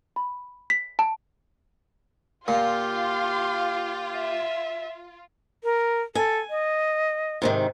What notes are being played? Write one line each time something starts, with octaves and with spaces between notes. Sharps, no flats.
B5
B6
A5
A#2 F4 G4 F5 C6
E5
A#4
A4 G#5
D#5
G#2 C3 D#3